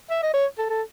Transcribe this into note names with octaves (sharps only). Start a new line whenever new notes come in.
E5
D#5
C#5
A4
A4